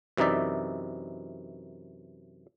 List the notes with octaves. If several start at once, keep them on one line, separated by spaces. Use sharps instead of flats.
F#2 C3 E3 D#4 D5 E5